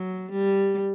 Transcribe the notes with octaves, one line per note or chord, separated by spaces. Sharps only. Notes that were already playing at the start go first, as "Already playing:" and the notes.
Already playing: F#3
G3